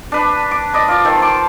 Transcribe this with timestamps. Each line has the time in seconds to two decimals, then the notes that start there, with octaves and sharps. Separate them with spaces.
0.12 D4 B4
0.51 D6
0.73 D5 D#5 B5
0.88 F4 D5
1.05 D#3 A4 C5
1.18 A5 C6 D6